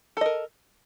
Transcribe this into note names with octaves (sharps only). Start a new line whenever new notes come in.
A4 A#4 D#5